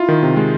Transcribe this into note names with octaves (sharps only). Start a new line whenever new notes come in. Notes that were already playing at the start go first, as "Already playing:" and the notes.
Already playing: E4 F4
D#3
C3
G#3